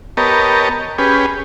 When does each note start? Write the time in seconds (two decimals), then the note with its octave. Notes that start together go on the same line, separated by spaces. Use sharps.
0.17 B3 G4 A#4 C#5 D#5 A5
0.98 C#4 G4 G#4 B4